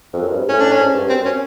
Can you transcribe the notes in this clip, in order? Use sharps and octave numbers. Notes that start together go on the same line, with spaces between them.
F2
F#2
G2
G#2
A2 C#4
D4
C#4
G#2
G2
F#2 C4
C#4